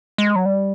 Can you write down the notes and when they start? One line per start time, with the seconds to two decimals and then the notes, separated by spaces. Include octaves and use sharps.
0.18 G#3
0.36 F#3
0.46 G3